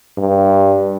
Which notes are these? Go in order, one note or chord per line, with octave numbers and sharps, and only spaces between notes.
G2